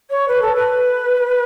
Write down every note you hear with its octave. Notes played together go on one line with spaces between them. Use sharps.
C#5
B4
A4
B4